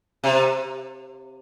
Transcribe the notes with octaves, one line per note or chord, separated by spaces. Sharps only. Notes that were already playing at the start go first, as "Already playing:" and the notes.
C3